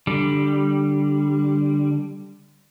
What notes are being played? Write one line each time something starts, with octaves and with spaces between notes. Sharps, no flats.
D3 G3